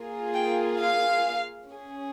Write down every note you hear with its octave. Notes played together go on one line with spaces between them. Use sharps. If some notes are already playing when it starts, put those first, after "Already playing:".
Already playing: A#3 F4 G#4
G5
F5
C#4 G#4